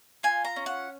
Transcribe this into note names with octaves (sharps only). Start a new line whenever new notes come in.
F4 G#5
A#5
C#4
F#5